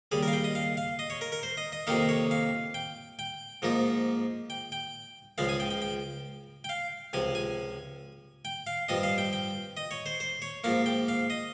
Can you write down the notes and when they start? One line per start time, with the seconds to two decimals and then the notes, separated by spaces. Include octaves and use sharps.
0.12 D#2 C#3 G3 G#4
0.23 A#4
0.28 F5
0.33 G5
0.44 D#5
0.55 F5
0.77 F5
0.99 D#5
1.10 C#5
1.21 A#4
1.32 A#4
1.43 C5
1.57 D#5
1.72 D#5
1.87 F2 C3 D#3 A#3 D#4 F5
2.09 C#5
2.31 F5
2.74 G5
3.19 G5
3.62 G#2 F3 A#3 D#4
4.50 G5
4.72 G5
5.38 C#2 C#3 F3 G#3 F5
5.49 G#5
5.60 G5
5.70 G5
5.82 G5
6.64 G5
6.69 F5
7.13 C#2 C3 F3 G#5
7.35 G#5
8.45 G5
8.67 F5
8.89 G2 F3 C4 D#5
9.03 F5
9.18 G5
9.33 G5
9.77 D#5
9.91 C#5
10.06 C5
10.20 C5
10.42 C#5
10.64 G#2 F3 A#3 F5
10.86 G5
11.08 F5
11.30 D#5